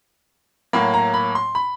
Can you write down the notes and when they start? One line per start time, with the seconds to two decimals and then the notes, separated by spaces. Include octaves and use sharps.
0.73 A2 F#3 A#3 B5
0.94 A#5
1.14 B5
1.35 C6
1.55 B5